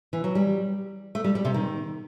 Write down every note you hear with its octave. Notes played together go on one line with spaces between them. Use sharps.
E3
F#3
G3
A3
G3
G3
C3
D#3